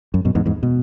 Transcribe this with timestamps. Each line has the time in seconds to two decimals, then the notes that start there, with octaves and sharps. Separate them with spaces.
0.14 F#2
0.25 F#2 B2
0.35 E2 G#2
0.46 E2 G#2
0.63 B2